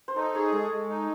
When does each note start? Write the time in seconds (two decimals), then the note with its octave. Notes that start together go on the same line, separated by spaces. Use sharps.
0.08 C5
0.16 D#4 A4
0.34 G#4 C#5
0.53 G#3 A4
0.71 G#3
0.89 D#4